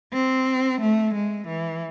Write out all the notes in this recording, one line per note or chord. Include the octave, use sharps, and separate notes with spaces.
C4
A3
G#3
E3